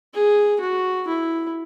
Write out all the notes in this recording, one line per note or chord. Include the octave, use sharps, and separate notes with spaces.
G#4
F#4
E4